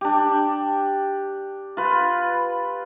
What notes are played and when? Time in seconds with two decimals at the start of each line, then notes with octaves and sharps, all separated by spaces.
0.01 D4 G4
1.77 F4 B4